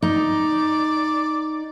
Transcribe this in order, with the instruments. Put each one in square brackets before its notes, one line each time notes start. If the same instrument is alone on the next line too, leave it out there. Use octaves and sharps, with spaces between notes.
[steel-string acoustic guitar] D#4 [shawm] D5